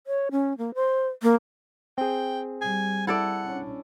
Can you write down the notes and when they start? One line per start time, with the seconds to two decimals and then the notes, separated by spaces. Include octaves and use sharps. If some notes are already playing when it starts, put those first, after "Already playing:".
0.07 C#5
0.31 C#4
0.58 A#3
0.75 C5
1.23 A#3
1.98 C4 G#4 G5
2.61 G3 G#5
3.07 E4 A4 D5 F#5
3.46 C#4 D4